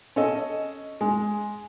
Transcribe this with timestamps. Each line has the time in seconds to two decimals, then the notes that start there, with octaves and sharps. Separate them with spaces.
0.16 C#4 A4 D#5
1.01 G#3